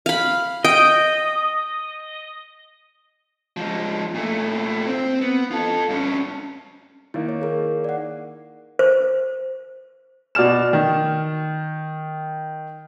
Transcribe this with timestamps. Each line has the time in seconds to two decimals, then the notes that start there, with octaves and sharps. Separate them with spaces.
0.06 F5 B5
0.65 D#5 G5
3.57 F3 G#3
4.14 A#2 A3
4.87 C4
5.21 B3
5.51 F4 A4
5.89 G2 C#4
7.14 D#3 A#3 E4
7.28 C#5
7.41 G#4 A#4
7.84 D5 F#5
8.79 C5
10.35 B2 D5 F6 E7
10.73 D#3